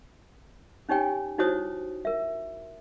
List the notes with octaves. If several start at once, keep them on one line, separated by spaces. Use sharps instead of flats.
C#4 D#4 G4 C#5 G5 G#5
D#4 E4 F#4 C5 C#5 D#6
A#4 E5